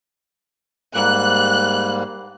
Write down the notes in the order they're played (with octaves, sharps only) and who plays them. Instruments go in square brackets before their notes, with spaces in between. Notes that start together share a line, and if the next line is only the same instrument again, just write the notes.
[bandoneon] G#2 G3 A#3 [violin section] F#6